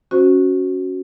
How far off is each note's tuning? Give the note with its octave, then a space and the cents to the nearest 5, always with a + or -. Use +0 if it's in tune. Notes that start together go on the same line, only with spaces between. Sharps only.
C#4 +0 F#4 +0 C5 +0